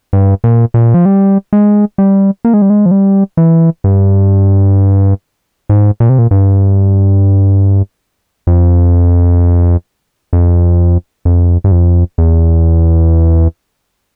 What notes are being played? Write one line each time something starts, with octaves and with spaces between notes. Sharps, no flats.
G2
A#2
A#2
F3
G3
G#3
G3
A#3
G#3
G3
G#3
F3
G3
E3
G2
G#2
A#2
C3
A#2
G2
F2
F2
F2
G2
F2
E2